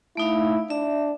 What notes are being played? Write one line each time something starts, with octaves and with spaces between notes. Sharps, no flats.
A3 D#4 E4 F5
D4 E5